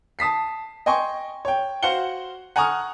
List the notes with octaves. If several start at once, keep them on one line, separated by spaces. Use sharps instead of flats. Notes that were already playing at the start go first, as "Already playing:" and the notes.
A5 D#6 B6 C7
D#5 G5 G#5 C6 C#6
C#5 G5
F#4 C5 F5 F#5 C#7 G7
F#5 G#5 A#5 C#6 D#6 F6